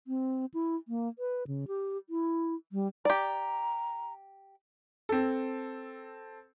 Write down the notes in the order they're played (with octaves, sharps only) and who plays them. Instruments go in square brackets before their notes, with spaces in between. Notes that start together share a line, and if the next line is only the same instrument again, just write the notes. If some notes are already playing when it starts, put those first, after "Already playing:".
[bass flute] C4
E4
A#3
B4
C#3
G4
E4
G3
[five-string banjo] G4 D5 [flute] A#5
[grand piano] C4 A4